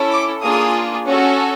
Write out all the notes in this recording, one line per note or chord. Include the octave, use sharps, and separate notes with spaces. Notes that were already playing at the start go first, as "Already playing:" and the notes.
Already playing: C#4 E4 A4
D6
A#3 D4 F4 G#4 D#6
C#4 F#4 A4